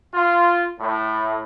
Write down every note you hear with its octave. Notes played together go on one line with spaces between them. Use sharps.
F4
A2